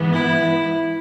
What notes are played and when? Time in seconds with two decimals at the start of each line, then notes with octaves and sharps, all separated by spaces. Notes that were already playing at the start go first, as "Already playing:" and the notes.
Already playing: G#2 E3 B3
0.13 E4